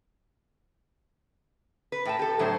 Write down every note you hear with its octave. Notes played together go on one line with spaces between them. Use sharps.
B4
A2 G5 A5
G4 A4
A2 F#3 D4 C5